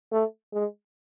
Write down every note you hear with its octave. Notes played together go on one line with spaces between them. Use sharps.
A3
G#3